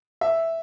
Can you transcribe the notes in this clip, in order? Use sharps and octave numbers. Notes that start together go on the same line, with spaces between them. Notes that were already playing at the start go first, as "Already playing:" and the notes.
E5